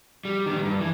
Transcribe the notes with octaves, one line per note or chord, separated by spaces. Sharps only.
G3
D#3 G3
G2
E3